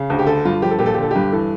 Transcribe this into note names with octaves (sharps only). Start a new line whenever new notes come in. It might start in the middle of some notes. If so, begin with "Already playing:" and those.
Already playing: C#3
D2
G4
D3 A4
G2 F4
F3 G4
A4
A#2 G4
A4
G4
D3 A4
G4
G2
E3 A4